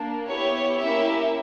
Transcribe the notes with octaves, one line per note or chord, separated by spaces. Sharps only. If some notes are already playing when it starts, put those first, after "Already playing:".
Already playing: A#3 D4
B3 E4 G4 C#5
A#3 C#4 E4 G4 E5